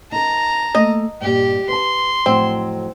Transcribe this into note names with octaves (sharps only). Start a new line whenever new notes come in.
D#4 A#4 A5 A#5
A3 A#3 D#5
G2 A#2 G4
B4 A5 C6
F2 A2 F#3 C4